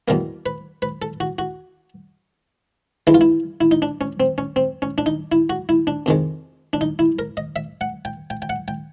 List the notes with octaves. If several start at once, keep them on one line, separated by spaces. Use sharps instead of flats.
E2 B2 G3 A#3 A#4
B4
B4
A4
F#4
F#4
G2 E3 G#3 E4
F4
E4
E4
D#4
D4
C#4
C4
C#4
C4
C#4
D4
D#4
E4
F#4
E4
D4
F2 C3 D#3 G#3
D4
D#4
E4
A#4
D#5
E5
F#5
G5
G5
G5
F#5
G5